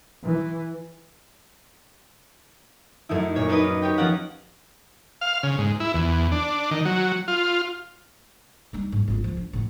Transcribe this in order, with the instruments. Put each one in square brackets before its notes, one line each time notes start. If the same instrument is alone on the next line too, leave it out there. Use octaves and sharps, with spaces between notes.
[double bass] E3
[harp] F#2 A3 D#4 E4
A#2 C#5 G#6
D4 D#4 A#4 B4 D#5
C#4
G4 C#5 G5
F3 A#3 C#4 F4 A#4 F#5
[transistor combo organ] F5
C#3
G#2
E4
E2
D4
D#3
F#3
F4
[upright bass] G3 D#4
G#2
G#1 F4
F3 C#4
D4
F#2 A2